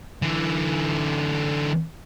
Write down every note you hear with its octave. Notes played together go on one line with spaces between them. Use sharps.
D3 E3